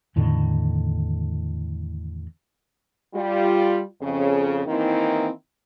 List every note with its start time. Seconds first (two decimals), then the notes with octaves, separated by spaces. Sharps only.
0.16 E2 A2 D3 D#3
3.14 G3 F4
4.01 F2 C#3
4.66 D#3 E3 A#3 C4 D#4 E4